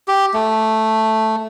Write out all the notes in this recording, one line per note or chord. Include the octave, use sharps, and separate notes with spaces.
G4
A3